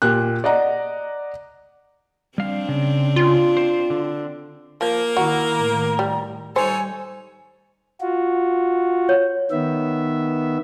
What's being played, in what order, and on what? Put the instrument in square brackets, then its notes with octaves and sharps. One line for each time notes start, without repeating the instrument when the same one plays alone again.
[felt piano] A#2 G4 F#6
D5 D#5 F#5 A#5
[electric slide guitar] G3 F5 [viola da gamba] C4 D4
[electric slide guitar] C#3
[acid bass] F4
[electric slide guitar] C5
D3
[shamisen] F3 [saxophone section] A#3 A#4
[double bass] D#3 E4 [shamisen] F#4 [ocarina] A#5
[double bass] A2 D#3
[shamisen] G3
[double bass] G3 [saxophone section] D#4 A4 C#5 [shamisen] C5 [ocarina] G#5
[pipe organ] F4 F#4
[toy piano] C#5
[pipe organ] D#3 B3 E5